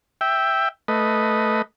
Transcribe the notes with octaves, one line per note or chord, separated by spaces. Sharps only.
E5 G5
A3 B4 D#5